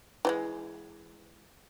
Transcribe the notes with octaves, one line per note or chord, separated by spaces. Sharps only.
E3 G3 G#3